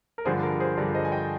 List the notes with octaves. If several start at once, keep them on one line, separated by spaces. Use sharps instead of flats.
A#4
G2 D3 F3 G#4 C5
A#4
G#4 C5
G2 D3 F3 A#4 D5
C5 D#5
G#5
D#5 G5